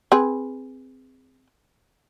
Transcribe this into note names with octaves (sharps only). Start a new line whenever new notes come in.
C4 G#4 B4